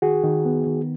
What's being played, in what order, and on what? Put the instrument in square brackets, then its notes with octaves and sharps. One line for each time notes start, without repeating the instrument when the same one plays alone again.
[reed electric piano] D#3 F#4 G#4
D#3
B3
D#3